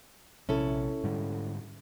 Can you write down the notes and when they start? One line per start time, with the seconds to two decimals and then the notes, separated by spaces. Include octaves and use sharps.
0.49 A#1 C3 C#4 E4 A4
1.04 G#2 D3 G3